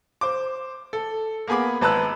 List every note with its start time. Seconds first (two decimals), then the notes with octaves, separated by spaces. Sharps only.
0.21 C5 D6
0.93 A4
1.47 A#3 B3 G#4 B5 D6
1.81 G#1 B4 A5 A#5 E6 F#6